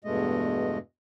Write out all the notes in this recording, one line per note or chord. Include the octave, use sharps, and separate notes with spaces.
E2 G2 B2 G#3 A3 D#5